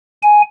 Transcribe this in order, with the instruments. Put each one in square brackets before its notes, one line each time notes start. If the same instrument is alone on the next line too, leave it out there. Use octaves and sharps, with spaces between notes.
[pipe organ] G#5